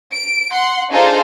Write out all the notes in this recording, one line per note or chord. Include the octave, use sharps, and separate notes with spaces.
D7
F#5 C6
D4 D#4 F4 G#4 A4 C5